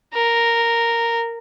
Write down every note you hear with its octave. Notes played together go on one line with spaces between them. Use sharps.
A#4